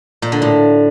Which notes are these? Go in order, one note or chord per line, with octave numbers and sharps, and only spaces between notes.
A#2
D3
A2